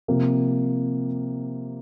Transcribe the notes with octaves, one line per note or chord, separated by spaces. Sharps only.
C3 F3 A#3